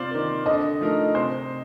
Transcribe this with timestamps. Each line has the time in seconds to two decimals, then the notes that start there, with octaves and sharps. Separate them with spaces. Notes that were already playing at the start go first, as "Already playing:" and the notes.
Already playing: C3 F4 C5 D5
0.11 D#3 A#3
0.46 D3 D#5
0.81 F3 A3 D#4 A#4
1.15 C3 C5